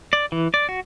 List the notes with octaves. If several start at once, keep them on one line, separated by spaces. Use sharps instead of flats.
D5
E3
D5
F#4